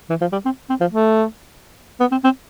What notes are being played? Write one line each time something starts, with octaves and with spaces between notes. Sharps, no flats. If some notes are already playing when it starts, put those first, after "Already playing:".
E3
F3
G3
C4
C4
F3
A3
B3
C4
C4